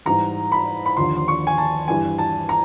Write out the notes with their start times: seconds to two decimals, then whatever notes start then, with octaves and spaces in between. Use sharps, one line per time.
0.05 G#2 E3 G3 A#5
0.52 B5
0.86 B5
0.97 D#2 D3 F3 C6
1.16 C6
1.28 C#6
1.47 G#5
1.58 A5
1.88 G2 E3 G3 G#5
2.18 A5
2.49 A#5